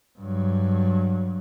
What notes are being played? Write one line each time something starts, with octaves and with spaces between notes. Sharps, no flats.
G2 F#3